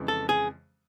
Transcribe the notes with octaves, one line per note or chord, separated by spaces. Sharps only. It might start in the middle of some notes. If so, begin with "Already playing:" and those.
Already playing: F2 C#3 E3 G#3
A4
G#4